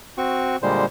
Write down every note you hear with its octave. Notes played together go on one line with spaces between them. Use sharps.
C4 F#4 C#6
A#2 D3 G3 G#3 C5